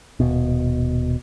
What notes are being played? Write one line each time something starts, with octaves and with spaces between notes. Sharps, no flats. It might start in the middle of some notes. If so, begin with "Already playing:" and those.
D#1 B2